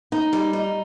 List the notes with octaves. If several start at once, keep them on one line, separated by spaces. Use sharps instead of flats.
D#4
G3
D#4